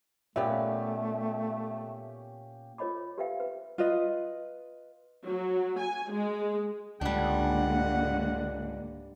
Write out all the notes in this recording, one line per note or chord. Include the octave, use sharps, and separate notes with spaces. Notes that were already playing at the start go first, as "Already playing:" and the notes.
A#2 A3 B3 C#4 G4 E5 F5
F4 A#4 C#5 D#5 B5 D6
G4 A#4 B4 E5 F5 G5
B4
F4 B4 D#5
F#3
G#5
G#3
C#2 G#2 D3 G3 A#3 D4 F#5